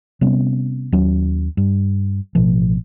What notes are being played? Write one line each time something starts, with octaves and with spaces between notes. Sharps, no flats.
C3 G3 B3 C#4
D#2 F#3 C#4
G2
A1 B2 F3